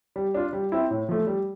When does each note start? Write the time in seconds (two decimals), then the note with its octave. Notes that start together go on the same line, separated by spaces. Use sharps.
0.16 G3
0.34 D4 F4
0.53 G3
0.72 C4 E4
0.90 A2
1.09 F3 A3
1.27 G3